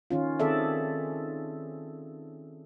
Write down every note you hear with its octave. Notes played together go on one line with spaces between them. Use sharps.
D#3 C#4 F4
D#3 C4 G#4 A4 D5 E5